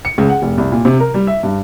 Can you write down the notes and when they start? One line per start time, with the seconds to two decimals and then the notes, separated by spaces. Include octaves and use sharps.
0.05 C#7
0.18 C#2
0.29 F#5
0.42 F1
0.58 C2
0.72 A#2
0.85 C3
1.00 A#4
1.14 G3
1.27 E5
1.43 G2